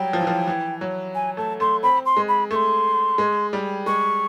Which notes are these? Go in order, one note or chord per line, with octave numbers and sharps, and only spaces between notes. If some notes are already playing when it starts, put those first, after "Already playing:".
Already playing: F#3 G3 G5
F3
E3
F3
E3
F#3
G#5
A3 A5
A3 C6
C4 B5
C6
G#3
B5
A3 C#6
C6
G#3
G3
G#3 C#6